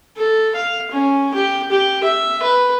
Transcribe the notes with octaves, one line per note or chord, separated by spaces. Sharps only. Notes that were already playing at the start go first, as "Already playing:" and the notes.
A4
F5
C#4
G4
G4
E5
B4